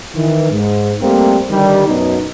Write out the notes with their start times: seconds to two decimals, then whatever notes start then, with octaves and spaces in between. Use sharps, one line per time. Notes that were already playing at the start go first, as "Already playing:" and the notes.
0.15 D#3 E3
0.51 G#2
1.02 G3 A3 A#3 C4
1.51 D3 D#3 G3
1.88 F#2 B2 D#4